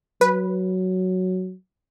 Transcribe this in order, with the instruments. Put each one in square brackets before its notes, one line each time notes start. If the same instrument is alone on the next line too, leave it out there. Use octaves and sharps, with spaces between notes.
[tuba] F#3 [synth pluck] B4